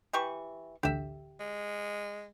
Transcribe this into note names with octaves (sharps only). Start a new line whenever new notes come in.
E3 G4 C#6
A1 D2 D3 G4 E5
G#3